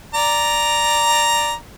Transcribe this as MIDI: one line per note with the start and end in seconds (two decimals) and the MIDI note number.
0.14 1.54 74
0.14 1.54 82